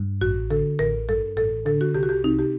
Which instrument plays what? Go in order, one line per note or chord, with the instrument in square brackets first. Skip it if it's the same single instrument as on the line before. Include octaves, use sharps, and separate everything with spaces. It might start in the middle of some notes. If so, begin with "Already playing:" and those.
Already playing: [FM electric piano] G2
[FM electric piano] A1 [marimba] F#4
[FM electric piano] D3 [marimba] A4
[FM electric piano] A1 [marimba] A#4
[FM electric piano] G2 [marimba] A4
[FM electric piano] A1 [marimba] A4
[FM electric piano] D3 [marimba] A4
[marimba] F#4
[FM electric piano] C2 [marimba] G4
[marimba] F#4
G4
[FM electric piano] C3 [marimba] D#4
[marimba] G4